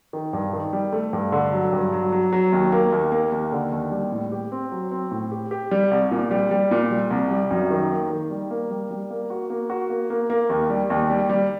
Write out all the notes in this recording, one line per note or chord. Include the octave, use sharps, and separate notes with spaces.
D#3
G2
D#3
G3
A3
G2
D3
F#3
G2
F#3
F#3
F#3
D#2
A#3
D#2
A#3
D#2
D3
D#2
G3
A2
G4
C4
F#3
C4
A2
G4
G4
G3
C2
A#2
G3
G3
A#2
G3
C2
G3
F#2
D#3
A#3
D#3
G3
A#3
G3
G3
A#3
F#4
A#3
F#4
A#3
A#3
A#3
D#2
G3
D#2
G3
G3